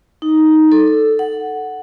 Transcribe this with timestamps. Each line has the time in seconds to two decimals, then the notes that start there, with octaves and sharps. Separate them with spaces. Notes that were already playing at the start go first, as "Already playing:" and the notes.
0.22 D#4
0.72 A4
1.19 F#5